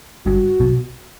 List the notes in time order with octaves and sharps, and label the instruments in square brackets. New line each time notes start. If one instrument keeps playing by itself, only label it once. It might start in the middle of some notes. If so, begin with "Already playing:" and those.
[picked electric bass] G1 G2 [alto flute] F#4
[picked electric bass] B1 B2